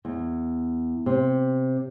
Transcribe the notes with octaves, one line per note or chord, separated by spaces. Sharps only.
E2
C3